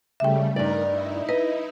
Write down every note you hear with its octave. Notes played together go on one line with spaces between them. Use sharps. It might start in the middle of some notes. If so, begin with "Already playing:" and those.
C#3 G3 A3 E5 G5
G2 D#4 A#4 D5
D#4 E4
B4 D#5